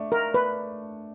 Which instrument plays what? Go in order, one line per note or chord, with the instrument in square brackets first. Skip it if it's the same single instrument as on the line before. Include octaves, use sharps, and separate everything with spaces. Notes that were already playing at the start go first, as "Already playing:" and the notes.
Already playing: [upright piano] A3 D4
[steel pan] A#4
B4